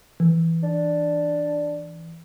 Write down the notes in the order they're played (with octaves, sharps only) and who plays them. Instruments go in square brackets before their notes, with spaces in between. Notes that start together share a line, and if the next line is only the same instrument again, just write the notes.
[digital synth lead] E3
[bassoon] D4